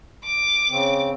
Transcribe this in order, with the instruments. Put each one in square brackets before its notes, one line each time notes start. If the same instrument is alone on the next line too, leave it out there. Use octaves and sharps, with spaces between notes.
[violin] D6
[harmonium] C#3 C4